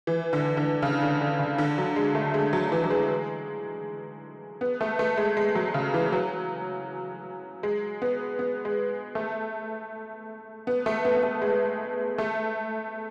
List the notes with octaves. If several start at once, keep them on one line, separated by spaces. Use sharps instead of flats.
E3
D3
D3
C#3
D3
D3
C#3
D3
F#3
G#3
A3
G#3
F#3
E3
F#3
G#3
B3
A3
A3
G#3
G#3
F#3
C#3
E3
F#3
G#3
B3
B3
G#3
A3
B3
A3
B3
B3
A3
G#3
A3